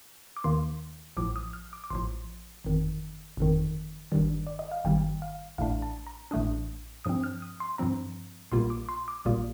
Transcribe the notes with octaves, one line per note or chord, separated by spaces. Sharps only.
D6
D#2 D#3 A#3 C6
A1 A2 F3 D6
D#6
F6
D6
D6
A1 A2 F3 C6
G1 F2 D#3
G1 F2 D#3
G1 G2 D#3 G3
D5
D#5
F5
G1 G2 D#3 G3 G5
F5
A1 A2 A3 D4 F5
A5
A#5
A1 A2 A3 D4 D#6
G2 F3 C4 D#6
F6
D#6
C6
G2 F3 C4 A#5
A#1 A#2 G3 A#3 F4 C6
D6
C6
D6
A#1 A#2 G3 A#3 F4 D#6